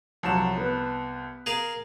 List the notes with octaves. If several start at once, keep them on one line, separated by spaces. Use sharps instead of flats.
C2 F3 F#3 A5 E7
B3 B4
G#4 A#4 F5